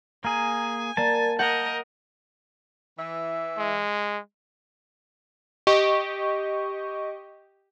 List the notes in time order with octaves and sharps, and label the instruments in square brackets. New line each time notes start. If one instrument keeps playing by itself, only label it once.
[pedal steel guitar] A#3 G#4 [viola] G#5 [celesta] A#5
[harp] A#3 [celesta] A#4 D5 A6 [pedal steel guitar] A5
[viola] A#4 D#5 [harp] F#5 [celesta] G6
[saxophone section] E3 E5
[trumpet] G#3
[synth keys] G4 D#5 C#6